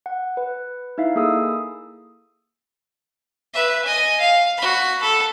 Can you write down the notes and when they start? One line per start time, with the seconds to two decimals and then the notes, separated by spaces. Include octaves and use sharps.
0.06 F#5
0.37 B4
0.98 D#4 E4 E5 F5
1.16 A#3 G#4 A4 D#6 E6
3.54 B4 E5
3.85 D#5 G#5
4.21 F5
4.58 F#4 B5
5.02 A4 B5